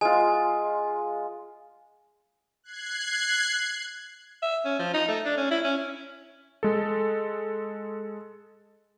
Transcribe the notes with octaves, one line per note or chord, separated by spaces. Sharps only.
G#3 F4 G#5
F#6 G#6 C7
E5
C#4
F3
D#4
A3
D4
C#4
E4
C#4
G#3 A4